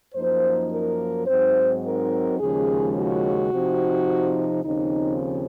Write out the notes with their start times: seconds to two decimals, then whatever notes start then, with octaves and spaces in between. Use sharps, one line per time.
0.14 F#2 F3 A#3 D#4 C5
0.71 A#4
1.27 G#2 F#3 C4 D#4 C5
1.83 A#4
2.39 D#2 C#3 F3 G#3 C#4 G#4
2.96 F#4
3.52 C3 F3 C4 D#4
4.64 D#2 C#3 F3 C4 D#4